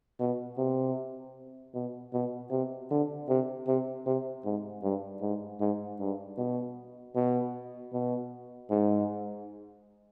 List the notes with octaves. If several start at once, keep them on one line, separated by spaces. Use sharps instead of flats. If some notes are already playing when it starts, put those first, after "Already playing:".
B2
C3
B2
B2
C3
D3
C3
C3
C3
G#2
G2
G#2
G#2
G2
B2
B2
B2
G#2